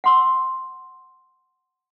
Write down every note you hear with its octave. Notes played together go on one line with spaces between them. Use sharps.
F#5 C6 E6